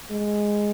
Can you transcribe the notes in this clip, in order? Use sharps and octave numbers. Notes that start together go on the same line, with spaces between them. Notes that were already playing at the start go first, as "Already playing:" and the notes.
G#3